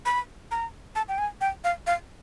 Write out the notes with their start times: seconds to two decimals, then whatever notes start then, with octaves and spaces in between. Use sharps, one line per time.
0.05 B5
0.51 A#5
0.95 A5
1.09 G5
1.18 G#5
1.41 G5
1.64 F5
1.87 F5